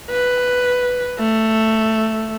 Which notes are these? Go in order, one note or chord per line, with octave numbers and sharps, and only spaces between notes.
B4
A3